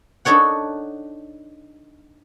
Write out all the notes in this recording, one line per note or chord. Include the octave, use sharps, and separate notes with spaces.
D4 D#4 A4 C#5 F#5